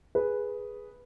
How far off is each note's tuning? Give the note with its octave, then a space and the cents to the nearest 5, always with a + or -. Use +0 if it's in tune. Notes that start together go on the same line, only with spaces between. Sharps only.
G#4 +0 B4 -5